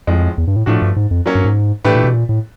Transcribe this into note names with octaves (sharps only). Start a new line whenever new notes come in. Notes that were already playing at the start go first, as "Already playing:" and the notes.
F2 A2 F3 G#3
E2
G2
A2
A2 F3 A3 D4 F#4
G2
G#2
F2
F#3 A#3 C#4
G2
G#2
A2 E3 A3 D4 G4 B4
A#2
B2
A#2
A2